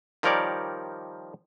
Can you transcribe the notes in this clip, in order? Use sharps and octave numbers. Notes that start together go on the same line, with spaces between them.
D#3 F3 G3 A#4 C#5 D5